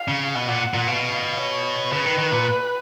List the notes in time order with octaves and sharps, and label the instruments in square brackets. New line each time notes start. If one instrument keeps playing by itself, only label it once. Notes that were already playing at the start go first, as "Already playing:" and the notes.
Already playing: [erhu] F5
[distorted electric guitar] C#3
[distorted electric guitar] B2 [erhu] F#5
[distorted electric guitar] A#2
A#2
[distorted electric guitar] B2 [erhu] F5
[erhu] C#5
[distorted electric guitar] C#3 [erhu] B4
[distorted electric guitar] D#3
D#3
A#2